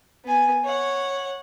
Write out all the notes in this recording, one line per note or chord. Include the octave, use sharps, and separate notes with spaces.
B3 G#5
C#5 F#5